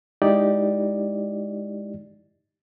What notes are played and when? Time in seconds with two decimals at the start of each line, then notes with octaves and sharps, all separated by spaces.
0.22 G#3 D#4 E4 G4 D5 D#5